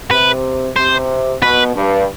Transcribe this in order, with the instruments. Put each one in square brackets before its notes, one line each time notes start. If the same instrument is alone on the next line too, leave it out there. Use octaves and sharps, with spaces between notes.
[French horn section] C3 [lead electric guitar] B4
[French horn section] C3 [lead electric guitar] C5
[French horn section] B2 [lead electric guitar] B4
[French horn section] G2